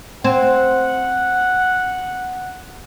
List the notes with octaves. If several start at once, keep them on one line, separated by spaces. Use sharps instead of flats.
C4 F#5